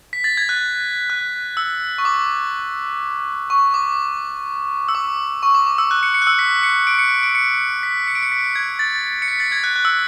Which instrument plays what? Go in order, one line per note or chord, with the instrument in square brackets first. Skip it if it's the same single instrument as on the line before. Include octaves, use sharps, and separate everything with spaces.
[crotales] B6
A6
G#6
F#6
F#6
E6
C#6
D6
C#6
D6
E6
D6
C#6
D6
D6
E6
F#6
C#7
C#7
F#6
E6
B6
C#7
D7
C#7
C#7
D7
C#7
B6
C#7
D7
C#7
B6
G#6
A6
C#7
B6
A6
G#6
F#6
F#6
E6